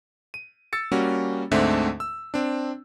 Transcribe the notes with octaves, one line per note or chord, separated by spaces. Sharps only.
D#7
E6 A6 C#7
G3 A#3 C#4 F#4
D2 G#2 D3 A3 C4 E5
E6
C4 D4